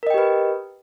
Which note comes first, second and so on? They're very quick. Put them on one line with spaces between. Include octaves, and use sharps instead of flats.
A#4 D#5 G5 G4 B4